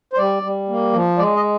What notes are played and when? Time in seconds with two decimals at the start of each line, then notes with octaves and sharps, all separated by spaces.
0.13 C5
0.18 G3 D5
0.43 G3
0.69 A#3
0.93 F3
1.18 G#3 D5
1.36 D#5